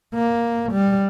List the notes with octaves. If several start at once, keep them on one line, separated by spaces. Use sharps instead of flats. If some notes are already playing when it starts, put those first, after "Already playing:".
A#3
G3